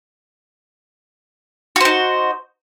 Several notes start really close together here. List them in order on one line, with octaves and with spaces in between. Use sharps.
F#4 C5 D#4